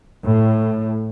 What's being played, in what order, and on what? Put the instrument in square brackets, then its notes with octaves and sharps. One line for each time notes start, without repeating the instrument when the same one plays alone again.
[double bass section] A2